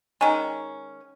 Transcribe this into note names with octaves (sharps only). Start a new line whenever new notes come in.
D#3 G#3 C#4